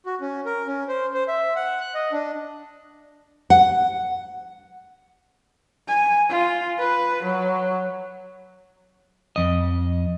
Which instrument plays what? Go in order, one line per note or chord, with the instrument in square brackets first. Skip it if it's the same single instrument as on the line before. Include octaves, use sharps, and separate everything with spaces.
[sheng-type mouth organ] F#4
C#4
A#4
C#4
C5
C5
E5
F#5
F#6
D#5
D4
[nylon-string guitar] F#5
[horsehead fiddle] G#5
F4
B4
F#3
[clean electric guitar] F2 D#5